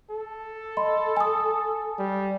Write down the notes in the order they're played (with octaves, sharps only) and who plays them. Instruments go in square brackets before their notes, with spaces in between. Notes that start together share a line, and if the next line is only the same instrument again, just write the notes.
[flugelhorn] A4
[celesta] D#5 B5 C6
G#5 D#6
[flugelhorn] G3